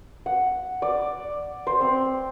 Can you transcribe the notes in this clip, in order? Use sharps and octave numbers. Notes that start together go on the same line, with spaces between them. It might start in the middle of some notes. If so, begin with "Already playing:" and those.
F#5
D5
C5
C4